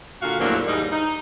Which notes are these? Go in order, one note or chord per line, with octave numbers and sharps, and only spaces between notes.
A#2 D3 F#4 F5
E2 A2 F3 F#3 A#3 D4
D#2 G#2 G3 D#4
D#4